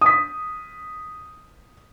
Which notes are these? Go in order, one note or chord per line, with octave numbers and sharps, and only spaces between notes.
D#6 B6